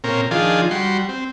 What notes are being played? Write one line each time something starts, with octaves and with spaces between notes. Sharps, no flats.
A#2 C4 C#4 A#4
D#3 F3 D4 F4 G#4
G3 F#4 C6
C4